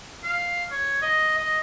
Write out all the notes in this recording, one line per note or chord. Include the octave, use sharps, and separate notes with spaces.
F5
C#5
D#5
D#5